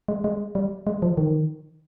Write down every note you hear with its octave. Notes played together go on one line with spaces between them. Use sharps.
G#3
G#3
G3
G#3
F3
D#3